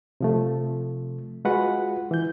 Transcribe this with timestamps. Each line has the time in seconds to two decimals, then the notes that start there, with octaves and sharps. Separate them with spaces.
0.21 C3 F3 A3
1.45 G#3 F4 F#4 B4 F#5
2.11 E3 G6